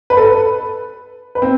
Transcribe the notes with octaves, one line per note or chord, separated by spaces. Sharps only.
B4
A4
B4
B4
C4